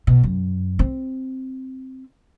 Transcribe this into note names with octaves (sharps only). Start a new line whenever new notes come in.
B2
F#2
C4